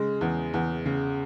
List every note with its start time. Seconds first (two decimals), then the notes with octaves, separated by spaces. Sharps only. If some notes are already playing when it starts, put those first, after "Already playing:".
Already playing: C#3 G#3
0.21 E2
0.54 E2
0.86 C#3